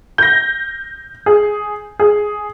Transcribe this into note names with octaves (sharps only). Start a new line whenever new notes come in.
G6 A#6
G#4
G#4